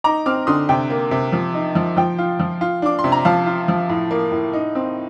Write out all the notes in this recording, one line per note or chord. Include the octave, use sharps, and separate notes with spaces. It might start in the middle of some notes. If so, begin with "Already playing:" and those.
D#4 A#5 D6
C4 D6 F6
D3 C6 D#6
C3 G5
A#3
C3
F3
D#4
F3
F3 G5
F4
F3
F4
D4 D6
C6
C3
A#5
F3 F5 A5
F4
F3
A2
A#3
A2
D#4
C4